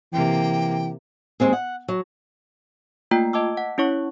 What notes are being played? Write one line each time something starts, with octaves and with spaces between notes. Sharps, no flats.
C3 E3 A#3 G5
D#2 G#3 C4 G#4
F#5
F#3
A3 A#3 F4 G5
D#5 A5 D6 E6
F#5
C#4 E4 C#5 C#6